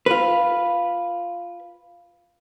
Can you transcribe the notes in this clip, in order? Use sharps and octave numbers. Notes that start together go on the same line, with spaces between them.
F4 B4